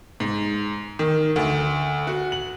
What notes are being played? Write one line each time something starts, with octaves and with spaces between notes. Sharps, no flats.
G#2
D#3
D2
F#4
F#7